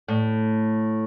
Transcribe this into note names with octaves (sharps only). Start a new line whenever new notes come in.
A2